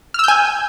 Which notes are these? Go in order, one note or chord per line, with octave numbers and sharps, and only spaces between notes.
G#5 E6 F6 G6